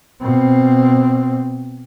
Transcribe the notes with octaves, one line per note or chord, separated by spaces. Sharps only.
B2 C4